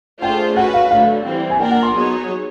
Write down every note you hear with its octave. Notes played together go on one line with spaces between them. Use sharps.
A3 D4 F4 G#4 C5 G5
C#4 F#4 B4 F#5
F5
D3 F#3 A3 F5
E3 G3 C4
G#5
A#3 D4 F4 A#4 D5 G5
F#5
C6
F#3 B3 D#4 G#4 C#5